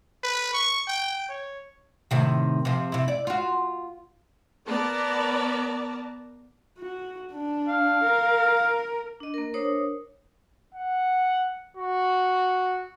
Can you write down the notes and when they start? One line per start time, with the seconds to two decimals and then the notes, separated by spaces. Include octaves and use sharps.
0.24 B4
0.54 C#6
0.88 G5
1.29 C#5
2.11 A2 C3 D#3
2.65 C3 F3
2.92 C3 E4
3.08 D5
3.27 F4 F#4
4.68 B3 A#4 D5 A5 A#5
6.79 F#4
7.33 D4
7.68 F5
8.04 A#4
9.20 D4 D#5
9.34 A#3 A#4
9.54 D4 A#4 C5 C#5 D#6
10.74 F#5
11.77 F#4